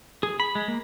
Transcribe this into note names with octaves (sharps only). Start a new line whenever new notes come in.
G#4
B5
G#3
A#3